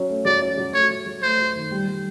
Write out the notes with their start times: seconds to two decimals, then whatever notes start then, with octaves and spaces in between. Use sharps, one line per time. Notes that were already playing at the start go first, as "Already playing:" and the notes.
Already playing: F#3 C#4
0.09 A3
0.25 F#3 D5
0.42 C#4
0.58 F#3
0.74 A3 C#5
0.90 F#3
1.06 F#3
1.23 A3 C5
1.39 F#3
1.55 D#3
1.71 G3
1.88 G3